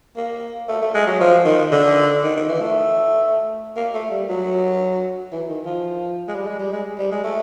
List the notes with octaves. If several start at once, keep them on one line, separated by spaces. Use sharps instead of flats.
A#3
A3
A3
G#3
F#3
F3
D#3
D3
D#3
D#3
E3
A3
A#3
A3
G3
F#3
E3
D#3
F3
G#3
G3
G#3
G3
G#3
G3
G#3
A3